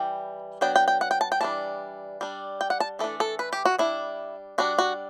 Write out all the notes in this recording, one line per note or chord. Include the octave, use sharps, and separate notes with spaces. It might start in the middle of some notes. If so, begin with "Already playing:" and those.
Already playing: E3 G3 G5
F#3 B3 D4 G5
G5
G5
F#5
G5
A5
G5
E3 G3 D4 A5
G3 D4
G5
F#5
A5
E3 A3 D4 A4
A4
B4
G4
F#4
G3 D4 E4
G3 D4 F#4
F#4